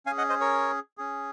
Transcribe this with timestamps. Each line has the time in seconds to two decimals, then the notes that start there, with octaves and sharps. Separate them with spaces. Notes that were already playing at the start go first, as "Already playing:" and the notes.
0.06 C#4 F5 G#5
0.11 G#4
0.18 D#5 F#5
0.29 C5 D#5
0.41 A#4 C#5
0.98 C#4 G#4